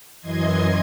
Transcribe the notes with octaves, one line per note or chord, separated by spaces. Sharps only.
F#2 E3 D#5 C6 G#6